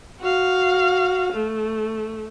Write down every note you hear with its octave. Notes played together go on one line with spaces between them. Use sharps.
F#4 F5
A3